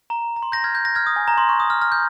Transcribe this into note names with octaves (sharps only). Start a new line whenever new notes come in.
A#5
A#5
C6
G6 A#6
F6 G#6
G6
G6 A#6
F6 G#6
D#6
G#5
A#5
C6
C#6
D#6
F6
F6
G6